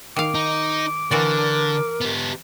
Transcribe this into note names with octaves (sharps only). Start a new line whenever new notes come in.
D#3 F5 D6
D#4
D3 E3 F#4 A#4 D5
B3 G4